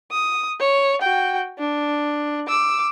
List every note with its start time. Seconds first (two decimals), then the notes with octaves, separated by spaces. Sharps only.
0.11 D#6
0.59 C#5
1.01 F#4 G5
1.59 D4
2.48 D6 E6